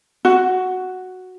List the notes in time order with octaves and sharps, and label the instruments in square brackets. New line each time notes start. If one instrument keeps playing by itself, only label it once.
[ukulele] F#4